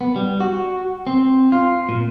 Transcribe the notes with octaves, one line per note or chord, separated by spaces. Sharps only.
B3
G3
F#4
C4
F4
A#2